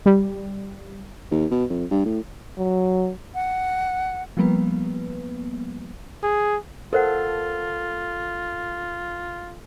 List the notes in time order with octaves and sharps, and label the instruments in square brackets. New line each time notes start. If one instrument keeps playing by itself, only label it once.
[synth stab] G3
[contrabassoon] D#2
B2
F2
G2
A2
[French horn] F#3
[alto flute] F#5
[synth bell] F3 G3 A#3 B3 B4
[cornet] G#4
[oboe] F4 [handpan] A4 [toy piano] A#4 C5 F#5